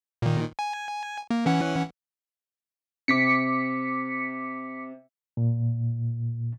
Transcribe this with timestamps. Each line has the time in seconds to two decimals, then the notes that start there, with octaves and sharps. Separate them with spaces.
0.22 A#2 D#3
0.59 G#5
1.31 A#3
1.46 E3 C#4 F#5
3.08 C3 D6 B6 C#7
5.37 A#2